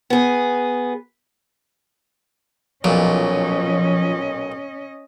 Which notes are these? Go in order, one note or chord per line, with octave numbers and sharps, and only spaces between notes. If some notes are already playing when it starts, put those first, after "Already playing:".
B3 G#4
B1 A#2 F3 C#4 D#5